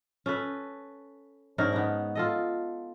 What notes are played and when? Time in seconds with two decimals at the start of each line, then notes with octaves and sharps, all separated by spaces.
0.26 C#4 A4 B4
1.58 G#2 C#4 D4 A#4
1.73 B3 D#4
2.15 F4 A4 D#5